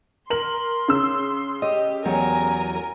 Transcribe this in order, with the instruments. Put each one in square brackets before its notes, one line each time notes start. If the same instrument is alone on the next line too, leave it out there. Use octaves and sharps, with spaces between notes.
[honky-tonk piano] A#4 F#7 [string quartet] C6
[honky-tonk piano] C#3 E6
[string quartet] G4 [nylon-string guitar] D#5
[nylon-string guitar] E2 F#3 G4 [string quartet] A#4 G#5 A#5